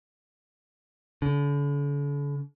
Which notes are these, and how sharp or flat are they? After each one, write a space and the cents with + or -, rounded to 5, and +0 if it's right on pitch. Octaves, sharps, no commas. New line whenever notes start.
D3 -45